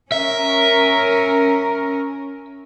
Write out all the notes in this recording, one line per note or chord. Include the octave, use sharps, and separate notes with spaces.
C#4 A#4 E5